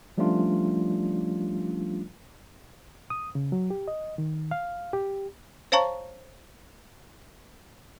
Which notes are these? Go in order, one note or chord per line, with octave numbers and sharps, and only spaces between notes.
F3 G3 A3 C#4 D4 F4
D#6
C#3
F#3
G4
D#5
D#3
F5
G4
C5 C#5 F5 A5 A#5 C#6